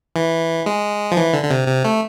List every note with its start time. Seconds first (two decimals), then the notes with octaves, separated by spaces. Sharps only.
0.16 E3
0.66 G#3
1.12 F3
1.17 E3
1.33 D3
1.43 D3
1.50 C3
1.68 C3
1.85 A3